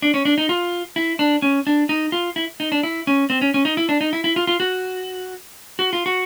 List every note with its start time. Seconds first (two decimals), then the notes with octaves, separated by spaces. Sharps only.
0.02 D4
0.14 C#4
0.25 D4
0.38 D#4
0.49 F4
0.96 E4
1.19 D4
1.42 C#4
1.67 D4
1.89 D#4
2.12 F4
2.36 E4
2.60 D#4
2.72 D4
2.83 E4
3.07 C#4
3.30 C4
3.41 C#4
3.54 C#4
3.65 D#4
3.77 E4
3.89 D4
4.01 D#4
4.13 E4
4.24 E4
4.36 F4
4.47 F4
4.60 F#4
5.79 F#4
5.93 F4
6.06 F#4